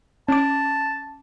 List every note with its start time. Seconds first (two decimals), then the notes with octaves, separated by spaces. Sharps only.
0.29 C#4 A5 D6